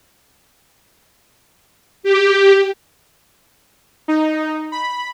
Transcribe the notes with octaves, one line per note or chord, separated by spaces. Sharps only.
G4
D#4
B5